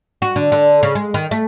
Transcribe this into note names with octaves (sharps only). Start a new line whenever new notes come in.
F#4
D3
D3
C#3
G#3
D#3
A3